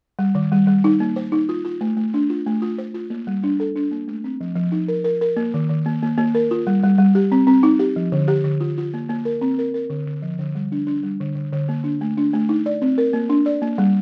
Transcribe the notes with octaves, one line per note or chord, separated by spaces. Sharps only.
G3
D#3
G3
G3
D#4
A#3
C5
D#4
F4
F4
A3
A3
D4
F4
A3
F4
C5
F4
A#3
G3
D4
A4
D4
A#3
A3
C4
F3
F3
D#4
A#4
A#4
A#4
A#3
D#3
D#3
A#3
A#3
A#3
A#4
F4
G3
G3
G3
G4
C4
C4
D#4
G4
F3
D3
G4
D3
F4
F4
A#3
A#3
A#4
C4
A#4
A#4
D3
D3
F3
D3
G3
D4
D4
G3
D3
D3
D3
A#3
D4
A3
D4
A3
D#4
D5
C4
A#4
A#3
D4
D5
A#3
G3